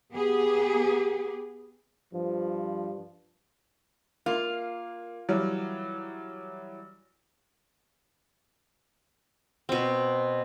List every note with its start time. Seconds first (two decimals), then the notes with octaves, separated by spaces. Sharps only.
0.13 B3 G4 G#4
2.13 G2 F3
4.26 A#3 F4
5.29 E3 F#3 G3
9.69 B2 C4